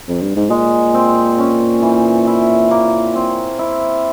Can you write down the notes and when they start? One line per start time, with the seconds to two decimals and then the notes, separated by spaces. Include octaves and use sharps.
0.08 F2
0.22 G2
0.36 G#2
0.50 A#2 G#3
0.94 C4
1.38 C#4
1.82 E3
2.27 E4
2.71 A#3
3.15 C4
3.59 E4